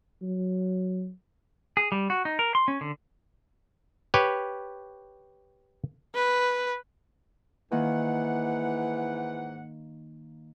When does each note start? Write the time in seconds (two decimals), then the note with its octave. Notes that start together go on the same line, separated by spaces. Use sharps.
0.22 F#3
1.77 G#4
1.92 G3
2.10 F#4
2.25 D#4
2.39 A#4
2.55 C6
2.68 C#4
2.81 D3
4.14 G4 B4 C#5
6.15 B4
7.72 G#2 D#3 E3 A#3 F#5